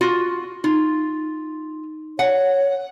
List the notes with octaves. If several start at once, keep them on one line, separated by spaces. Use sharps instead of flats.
F4 F#4
D#4 F4
C#5 F#5